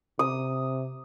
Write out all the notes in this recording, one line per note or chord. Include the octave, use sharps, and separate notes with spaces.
C3 D#6